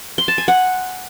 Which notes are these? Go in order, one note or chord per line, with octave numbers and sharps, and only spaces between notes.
C6
A5
G#5
F#5